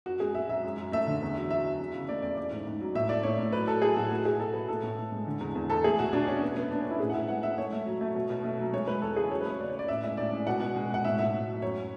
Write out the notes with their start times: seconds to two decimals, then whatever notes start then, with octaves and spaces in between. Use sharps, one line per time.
0.06 F#2 F#4
0.20 G#3 G#4
0.35 G#3 E5
0.49 F#2 E5
0.64 F#2
0.78 F#2
0.92 A3 E5
1.07 D3
1.22 E2
1.36 F#3
1.51 F#3 E5
1.66 F#3
1.80 E2
1.94 C#3
2.09 A3 D5
2.22 E2 D5
2.37 A3 D5
2.51 G#2
2.67 G#2
2.81 F#3
2.95 A2 E5
3.09 A3 D5
3.23 A2 C#5
3.38 A2
3.52 F#3 B4
3.67 F#3 A4
3.82 F#3 G#4
3.96 A2 F#4
4.10 A3 F#4
4.25 B2 G#4
4.40 B2 A4
4.54 A3 B4
4.68 A2 A4
4.83 A2
4.98 A2
5.12 G#3
5.27 D3
5.41 E2
5.55 E2
5.70 E2 A4
5.84 A3 G#4
5.99 B2 F#4
6.13 B2 D4
6.27 B2 C#4
6.42 A3 B3
6.57 A3 B3
6.70 A3 D4
6.80 C#4
6.85 A3
6.91 E4
7.00 A2 G#4
7.10 F#5
7.14 A2 E5
7.28 G#3 F#5
7.43 G#3 E5
7.57 A3 C#5
7.72 A3
7.86 F#3
8.01 A3
8.15 B2
8.30 B2
8.44 A3
8.59 F#3
8.73 G#3 C#5
8.87 G#3 B4
9.02 E2 A4
9.17 C#3 G#4
9.31 F#3 C#5
9.41 B4
9.45 A3 C#5
9.60 C#3 D5
9.70 C#5
9.74 C#3 D5
9.88 A2 E5
10.03 G#3 E5
10.17 A2 D5
10.33 G#3
10.47 B2 F#5
10.61 B2
10.76 G#3
10.90 B2 F#5
11.05 A2 E5
11.19 A2 E5
11.33 A2
11.48 F#3
11.62 F#2 C#5